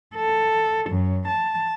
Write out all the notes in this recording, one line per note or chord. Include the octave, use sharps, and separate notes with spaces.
A4
F#2
A5